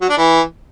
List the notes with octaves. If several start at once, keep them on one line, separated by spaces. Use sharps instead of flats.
F#3
D4
E3